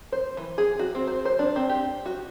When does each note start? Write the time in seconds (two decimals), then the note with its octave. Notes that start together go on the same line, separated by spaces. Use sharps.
0.12 C5
0.37 E3
0.58 G#4
0.79 F#4
0.95 C4
1.07 C5
1.25 C5
1.39 D4
1.56 C4
1.69 G4
2.06 F#4